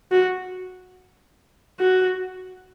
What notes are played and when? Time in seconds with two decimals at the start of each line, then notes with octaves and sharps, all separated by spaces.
0.11 F#4
1.79 F#4